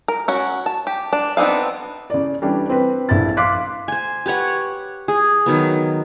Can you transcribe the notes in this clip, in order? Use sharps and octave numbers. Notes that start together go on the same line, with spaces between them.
A#4
C#4 F#4
A5
G4
D4
B3 C4 D4 D#4 F5
C#3 D5
E3 G3 C#4 D4
C4 B4
A#1 E4 A6
F5 C6 D6 F#6 B6
C5 G#5
G4 B4 C#5 F#5
G#4
D#3 F#3 B3